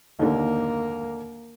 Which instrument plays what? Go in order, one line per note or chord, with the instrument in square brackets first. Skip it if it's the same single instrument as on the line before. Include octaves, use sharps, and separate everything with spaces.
[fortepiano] D#2 D3 [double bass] A#3